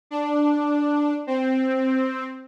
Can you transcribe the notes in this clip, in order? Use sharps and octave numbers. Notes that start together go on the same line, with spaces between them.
D4
C4